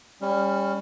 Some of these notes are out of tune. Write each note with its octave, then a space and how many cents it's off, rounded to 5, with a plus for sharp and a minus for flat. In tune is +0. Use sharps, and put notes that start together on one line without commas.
G3 +25 C#4 +0